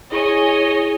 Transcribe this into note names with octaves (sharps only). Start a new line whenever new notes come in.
E4 G#4 C#5 D#5 G#5